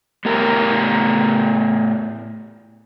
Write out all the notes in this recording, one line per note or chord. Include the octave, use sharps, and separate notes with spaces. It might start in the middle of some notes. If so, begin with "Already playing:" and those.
A2 B3 G4 A#4